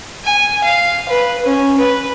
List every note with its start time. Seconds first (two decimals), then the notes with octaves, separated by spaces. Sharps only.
0.24 G#5
0.64 F5
1.09 B4
1.46 C#4
1.77 B4